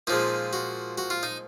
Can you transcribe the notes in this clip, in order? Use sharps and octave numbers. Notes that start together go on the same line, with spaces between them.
A#2 F3 G#3 D#4
F#4
F#4
F4
D#4